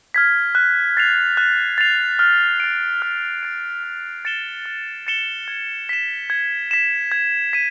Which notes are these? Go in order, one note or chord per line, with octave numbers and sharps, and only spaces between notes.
F6 G#6 B6
F#6
A6 C7 F7
F#6
A6 C7 F7
F6
A6 D7
F6
A6 D7
F6
A6 C#7 E7 G7
F6
A6 C#7 E7 G7
G#6
B6 E7
G#6
B6 E7
G#6
B6 D#7